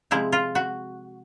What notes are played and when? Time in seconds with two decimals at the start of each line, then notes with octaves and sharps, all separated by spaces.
0.11 C3 F3 G#3 E4
0.32 F4
0.55 F#4